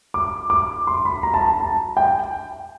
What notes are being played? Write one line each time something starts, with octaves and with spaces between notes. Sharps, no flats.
D6
D6
C6
B5
A#5
A5
A#5
A5
G5